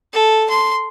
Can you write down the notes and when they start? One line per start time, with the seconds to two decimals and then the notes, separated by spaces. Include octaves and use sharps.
0.13 A4
0.50 C6